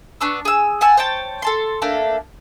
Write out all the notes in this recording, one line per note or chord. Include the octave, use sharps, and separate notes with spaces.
B3 D4 C#6 E6
G#4 E6
F#5 G#5 A5 E6
C5 C#5 G5 A5
A4 A5 C6
A3 A#3 D4 A4